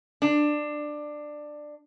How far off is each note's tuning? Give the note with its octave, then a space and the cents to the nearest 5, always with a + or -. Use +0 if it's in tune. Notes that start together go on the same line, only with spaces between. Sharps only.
D4 +15